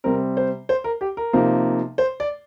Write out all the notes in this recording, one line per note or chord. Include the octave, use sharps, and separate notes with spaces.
C3 G3 C4 A#4
C5
C5
A#4
G4
A#4
C3 F3 A#3 D#4
C5
D5